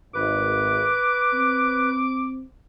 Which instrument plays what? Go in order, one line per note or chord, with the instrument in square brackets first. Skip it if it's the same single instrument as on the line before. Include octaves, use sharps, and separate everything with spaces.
[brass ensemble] G#1 [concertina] B4 [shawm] D6
[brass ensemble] C4